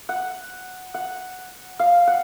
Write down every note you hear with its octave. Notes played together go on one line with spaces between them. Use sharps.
F#5
F#5
F5
F#5